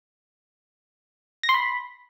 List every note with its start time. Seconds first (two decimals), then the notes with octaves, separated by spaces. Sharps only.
1.43 A#6
1.49 C6
1.54 B5